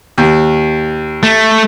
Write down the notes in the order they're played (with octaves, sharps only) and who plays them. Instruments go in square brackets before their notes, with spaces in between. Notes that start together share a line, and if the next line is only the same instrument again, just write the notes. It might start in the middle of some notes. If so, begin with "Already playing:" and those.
[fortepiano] D#2
[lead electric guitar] A3